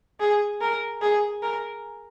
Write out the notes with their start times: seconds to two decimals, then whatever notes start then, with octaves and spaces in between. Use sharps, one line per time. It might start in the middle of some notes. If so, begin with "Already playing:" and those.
0.20 G#4
0.61 A#4
1.01 G#4
1.43 A#4